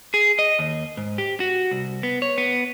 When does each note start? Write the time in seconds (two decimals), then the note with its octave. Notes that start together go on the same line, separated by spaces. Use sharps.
0.14 G#4
0.39 D#5
0.59 D#2
0.97 G#2
1.18 G4
1.40 F#4
1.71 C2
2.03 B3
2.22 C#5
2.38 B3